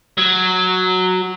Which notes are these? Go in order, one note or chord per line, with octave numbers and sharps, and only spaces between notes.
F#3